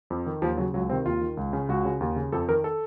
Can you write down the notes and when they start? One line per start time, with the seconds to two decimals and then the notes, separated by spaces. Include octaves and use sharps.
0.10 F2
0.26 D#3
0.42 D#2 F3
0.57 C#3 F#3
0.74 C#2 F#3
0.89 C3 D#3 C4
1.05 D#2 F4
1.21 D#3
1.37 C#2
1.53 C#3
1.69 C#2 F#4
1.85 C#3
2.01 D#2
2.16 C#3
2.32 F2 A4
2.48 D#3 A#4
2.64 A4